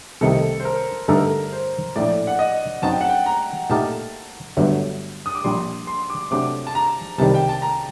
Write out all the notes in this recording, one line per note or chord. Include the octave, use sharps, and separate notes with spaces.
C2 C3 D#3 A3 D#4 A4
C5
A#4
G2 D3 A3 D#4 A4 A#4
C5
A#1 A2 A3 D5
F#5
D#5
F#2 F#3 C4 D#4 F#4 A5
G5
F#5
G5
A#5
A#2 A3 D#4 G4 A#4 A5
G1 G2 F#3 A3
D#6
D6
A#1 A#2 G3 C6
C6
D6
C3 F#3 A3 D4 G4 D6
A5
A#5
C2 C3 D#3 G3 A5
G5
A5
A#5